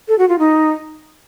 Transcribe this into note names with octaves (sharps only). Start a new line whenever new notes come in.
A4
F#4
F4
D#4